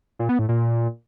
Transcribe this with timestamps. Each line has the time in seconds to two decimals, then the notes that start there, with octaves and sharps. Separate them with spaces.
0.19 A#2
0.29 B3
0.39 A2
0.49 A#2